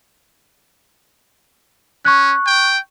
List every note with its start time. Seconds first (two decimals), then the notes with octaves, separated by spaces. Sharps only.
2.05 C#4 C#6 F#6
2.46 G5